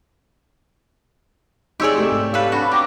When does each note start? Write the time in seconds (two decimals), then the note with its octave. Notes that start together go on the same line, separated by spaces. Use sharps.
1.80 D#4 G4 G#4 C#5 D5 C6 E6 D7
1.96 C3 A3 E6
2.12 G#2
2.34 A4 B4 C#5 F5
2.52 D4 F#4 B5
2.72 G4 G5 A#5 D6 A#6